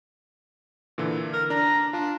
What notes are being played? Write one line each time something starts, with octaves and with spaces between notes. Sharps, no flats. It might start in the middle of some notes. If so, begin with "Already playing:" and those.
A#2 D3 E3
A#4
D4 A#5
D4 F4